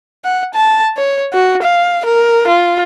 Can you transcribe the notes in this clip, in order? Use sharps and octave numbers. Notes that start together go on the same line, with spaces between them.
F#5
A5
C#5
F#4
F5
A#4
F4